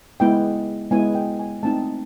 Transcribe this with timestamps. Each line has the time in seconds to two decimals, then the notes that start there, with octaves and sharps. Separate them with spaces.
0.20 G#3 B3 E4 G5
0.91 G#3 B3 E4 G#5
1.15 G5
1.39 G#5
1.63 A3 C4 D#4 A5